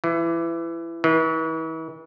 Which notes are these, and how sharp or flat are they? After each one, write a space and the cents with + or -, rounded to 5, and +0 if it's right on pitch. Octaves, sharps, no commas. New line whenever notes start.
E3 +20
E3 -40